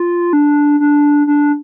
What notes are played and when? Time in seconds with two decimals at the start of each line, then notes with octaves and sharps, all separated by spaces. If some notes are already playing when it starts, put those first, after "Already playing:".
Already playing: F4
0.33 D4
0.80 D4
1.27 D4